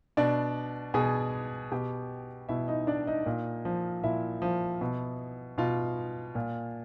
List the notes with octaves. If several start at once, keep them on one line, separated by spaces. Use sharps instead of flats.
B2 D4 D5
B2 G#4 G#5
B2 G4 G5
B2 E4 E5
D#4 D#5
D4 D5
D#4 D#5
A#2
F3
A#2 E4 E5
F3
B2
B2 F4 F5
A#2